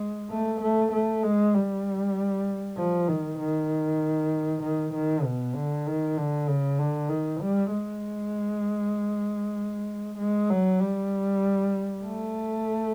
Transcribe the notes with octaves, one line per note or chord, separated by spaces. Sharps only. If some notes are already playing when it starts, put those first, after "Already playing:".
Already playing: G#3
A3
A3
A3
G#3
G3
F3
D#3
D#3
D#3
D#3
B2
D3
D#3
D3
C#3
D3
D#3
G3
G#3
G#3
F#3
G3
A3